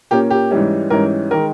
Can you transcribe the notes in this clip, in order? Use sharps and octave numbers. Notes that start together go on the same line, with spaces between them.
A#2 A#3 C#4 G4
G4
G#2 E3 G3 C#4
G#2 E3 G3 C#4 A#4
D#3 G#3 A#4